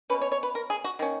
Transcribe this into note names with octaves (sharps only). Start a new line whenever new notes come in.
B2 A#3 C#4 B4
C#5
C#5
B4
A#4
G#4
F#4
D#3 A#3 C#4